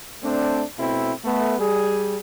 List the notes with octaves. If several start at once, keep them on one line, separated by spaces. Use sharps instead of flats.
A3 C4 D4
B2 A3 C4 E4
A3 B3
G3 G#4